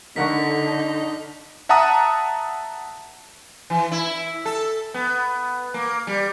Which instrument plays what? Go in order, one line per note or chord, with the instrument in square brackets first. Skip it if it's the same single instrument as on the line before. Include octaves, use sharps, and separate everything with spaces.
[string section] D3 [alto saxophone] D#4 [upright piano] A#4 F#5 C#6 [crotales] B6
[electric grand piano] E5 F#5 A5 A#5 D#6
[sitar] E3
E4
A4
B3
A#3
G3